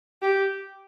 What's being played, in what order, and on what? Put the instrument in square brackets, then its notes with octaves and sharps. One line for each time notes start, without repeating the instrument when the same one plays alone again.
[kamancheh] G4